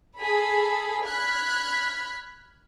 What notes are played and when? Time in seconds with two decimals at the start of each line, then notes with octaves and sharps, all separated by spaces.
0.18 G#4 A4 B5
1.06 B5 F6 F#6 G#6 B6